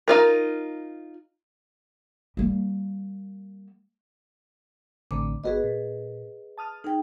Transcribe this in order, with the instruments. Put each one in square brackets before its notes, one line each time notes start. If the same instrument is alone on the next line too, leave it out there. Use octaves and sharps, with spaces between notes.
[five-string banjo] D#4 F4 A#4
[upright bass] G3 A#3
[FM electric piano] A1 D3 C4 [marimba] D6
[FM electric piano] G#1 B3 F#4 [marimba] G#4 B4 D#5
[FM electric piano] A#2
A5 D#6 F6
[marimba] D#4 G5 [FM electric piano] G#4